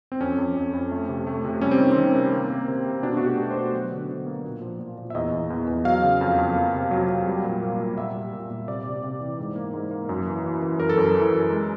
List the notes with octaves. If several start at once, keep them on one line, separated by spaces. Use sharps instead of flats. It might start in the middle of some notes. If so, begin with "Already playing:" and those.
C4
F2 C#4
F2
F2
F2
A3
C3
A3
C3
G3 C#4
C4
D#3
C4
D#3
C3
A#3
A#3
C3
C3
B2 D4
A3 F#4
G4
A3
C5
B2
F#3
D3
D3
A#3
A#2
F3
A#2
A#2
E5
E2 D#5
E2
E2
E2
F#3 F5
C#3
F2
F2
A#3
C3
F#3
F#3
G3
A#2
A#3
A#2
A#2 E5
G3
A#2
A#2
C3 D5
C3
C3
E3
G#2
A#3
G#2
A#3
F#2
E3
E3
E3
F#2 A#4
A4
F#2 A#4
E3
F#2
G#3